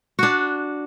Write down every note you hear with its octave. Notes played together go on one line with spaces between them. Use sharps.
D4 F#4